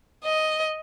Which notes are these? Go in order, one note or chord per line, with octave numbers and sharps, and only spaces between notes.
D#5